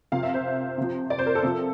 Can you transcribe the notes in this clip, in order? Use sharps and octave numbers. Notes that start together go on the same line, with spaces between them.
C3 F3 F5
E5
C5
C3 F3
D5
C5
A#4
A4
C3 F3